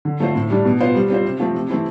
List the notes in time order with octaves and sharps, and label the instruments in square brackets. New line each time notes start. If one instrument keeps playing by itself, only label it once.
[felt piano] D3
A3 C4 F4 C5
A2
G3 D4
B2
B3 F4 C5
G3
C4 F4 C5
C3
F3 A3 C4
C3
E3 A3 C4 E4